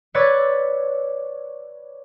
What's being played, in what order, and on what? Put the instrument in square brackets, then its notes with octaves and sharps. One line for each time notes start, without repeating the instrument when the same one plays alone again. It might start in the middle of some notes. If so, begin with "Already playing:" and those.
[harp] B4 C#5 D5 E6 G#6 A6